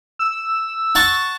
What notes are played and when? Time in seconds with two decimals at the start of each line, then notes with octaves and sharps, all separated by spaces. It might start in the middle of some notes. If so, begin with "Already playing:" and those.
0.19 E6
0.95 F#5 A5 C#6